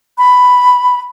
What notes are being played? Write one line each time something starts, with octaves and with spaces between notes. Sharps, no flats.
B5